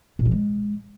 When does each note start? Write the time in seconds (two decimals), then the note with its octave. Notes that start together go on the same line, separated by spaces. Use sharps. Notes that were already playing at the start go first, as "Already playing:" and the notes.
0.19 A#2
0.25 E3
0.32 G#3